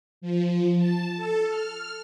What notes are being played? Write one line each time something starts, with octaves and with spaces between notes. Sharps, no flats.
F3
A5
A4
F6